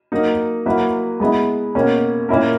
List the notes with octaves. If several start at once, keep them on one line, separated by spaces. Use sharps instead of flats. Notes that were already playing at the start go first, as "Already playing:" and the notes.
F#3 A#3 D#4
F#3 A#3 E4 B4
G#3 B3 E4
B2 A#3 C#4
A#2 A#3 C#4 E4 A#4